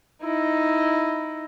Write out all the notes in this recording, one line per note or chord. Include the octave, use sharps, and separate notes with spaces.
D#4 E4